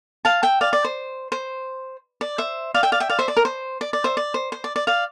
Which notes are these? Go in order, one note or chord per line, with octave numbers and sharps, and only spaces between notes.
F5 A5
E5 G5
D5 F5
D5
C5
C5
D5
C5 E5
D5 F5
E5 G5
D5 F5
E5 G5
D5 F5
C5 E5
D5
A#4
C5
D5
D5
C5 E5
D5
C5
C5
D5
D5
D5 F5